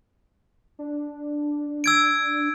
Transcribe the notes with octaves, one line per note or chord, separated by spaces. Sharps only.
D4
E6 G#6 D7